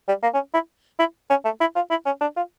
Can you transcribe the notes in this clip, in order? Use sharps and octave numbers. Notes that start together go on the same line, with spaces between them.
G3
A#3
C#4
E4
E4
C#4
A3
E4
F4
E4
C#4
D4
F4